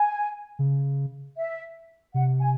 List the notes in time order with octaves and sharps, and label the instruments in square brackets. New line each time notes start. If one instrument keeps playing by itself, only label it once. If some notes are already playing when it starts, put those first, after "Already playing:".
Already playing: [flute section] G#5
[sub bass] C#3
[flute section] E5
[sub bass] C3 [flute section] F#5
[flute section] G#5